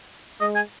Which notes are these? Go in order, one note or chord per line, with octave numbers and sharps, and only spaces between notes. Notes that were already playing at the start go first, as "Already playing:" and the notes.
G#3 D#5
G#5